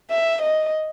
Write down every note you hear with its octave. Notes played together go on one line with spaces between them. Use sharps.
E5
D#5